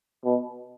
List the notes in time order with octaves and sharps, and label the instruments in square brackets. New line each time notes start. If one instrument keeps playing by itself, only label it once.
[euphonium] B2